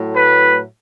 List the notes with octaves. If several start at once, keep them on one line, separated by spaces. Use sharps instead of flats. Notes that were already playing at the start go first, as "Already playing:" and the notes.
Already playing: A2 F#3 A3
B4